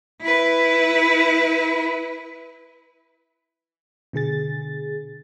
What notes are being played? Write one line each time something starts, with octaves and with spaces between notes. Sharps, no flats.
E4 B4
B2 D3 G#4 A6